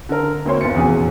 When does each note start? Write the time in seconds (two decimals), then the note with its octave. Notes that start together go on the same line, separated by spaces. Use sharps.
0.09 D3 A#4
0.45 D2 A#3 C4 C#5 C6
0.61 G1 B3 A6 C#7
0.74 F1 E2 A#2 C#4 F#4 G#4